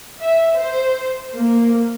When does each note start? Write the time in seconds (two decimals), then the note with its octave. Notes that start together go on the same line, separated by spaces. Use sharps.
0.20 E5
0.57 C5
1.35 A#3